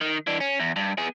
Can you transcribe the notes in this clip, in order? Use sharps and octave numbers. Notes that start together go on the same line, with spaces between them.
D#3
E3 D4
C#4
E2
G2
B3 G#4